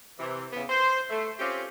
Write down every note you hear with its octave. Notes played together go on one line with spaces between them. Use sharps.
C3 E3
E2 C#3 B3
C5
A3
C4 C#4 F4 G4